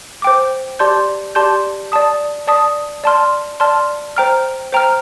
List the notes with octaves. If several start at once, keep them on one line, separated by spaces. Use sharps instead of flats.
C5 G5 D6
G4 D5 A5 C6 G6
G4 D5 A5 C6 G6
D5 A5 D#6
D5 A5 D#6
D5 A5 C6 F6
D5 A5 C6 F6
C5 G5 A#5 F6
C5 G5 A#5 F6